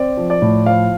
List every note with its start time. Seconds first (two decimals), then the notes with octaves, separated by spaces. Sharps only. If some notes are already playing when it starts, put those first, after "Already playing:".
Already playing: C4 D5
0.17 F3
0.30 D5
0.42 A2
0.66 F3 F5